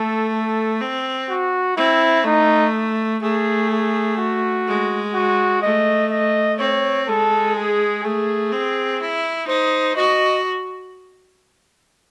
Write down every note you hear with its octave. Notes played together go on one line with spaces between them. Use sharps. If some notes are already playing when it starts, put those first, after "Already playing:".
Already playing: A3 A4
A4
C4
F#4
C4 E4
A3 D#4
A3 G#4
G#4
F#4
G#3
F#4
A3 D#5
D#5
C4 C#5
G#3 A4
G#4
A3 G#4
C4
E4
D#4 C5
F#4 D#5